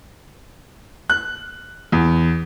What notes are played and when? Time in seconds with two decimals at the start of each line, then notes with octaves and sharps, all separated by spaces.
1.10 F#6
1.92 E2